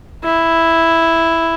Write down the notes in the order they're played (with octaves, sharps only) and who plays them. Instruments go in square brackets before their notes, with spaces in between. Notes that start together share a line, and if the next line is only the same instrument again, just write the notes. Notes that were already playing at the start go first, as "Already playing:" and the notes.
[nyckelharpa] E4